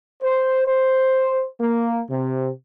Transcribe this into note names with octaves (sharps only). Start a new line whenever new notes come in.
C5
C5
A#3
C3